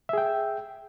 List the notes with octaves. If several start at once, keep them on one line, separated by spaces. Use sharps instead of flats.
G#4 E5 G5